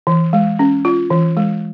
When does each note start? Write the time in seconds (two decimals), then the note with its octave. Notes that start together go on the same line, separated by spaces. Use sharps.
0.07 E3
0.33 G#3
0.59 C#4
0.85 F4
1.10 E3
1.37 G#3